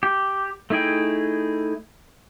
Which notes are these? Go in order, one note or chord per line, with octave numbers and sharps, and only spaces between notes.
G4
A3 D#4 E4 G#4 G5